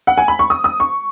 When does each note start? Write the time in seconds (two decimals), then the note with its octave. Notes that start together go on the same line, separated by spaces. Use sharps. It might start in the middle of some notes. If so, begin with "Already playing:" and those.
0.07 F#5
0.18 G#5
0.28 B5
0.39 C#6
0.50 D#6
0.64 D#6
0.80 C#6